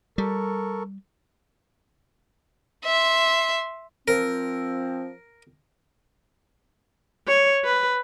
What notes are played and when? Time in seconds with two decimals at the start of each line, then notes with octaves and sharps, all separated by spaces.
0.18 G3 A4 A#4 C#6
2.85 E5 C6
4.08 F3 C4 A#4
7.27 C#5
7.65 B4